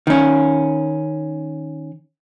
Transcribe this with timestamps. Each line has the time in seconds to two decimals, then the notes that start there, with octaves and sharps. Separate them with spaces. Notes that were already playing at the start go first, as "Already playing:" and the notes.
0.07 D#3 C#4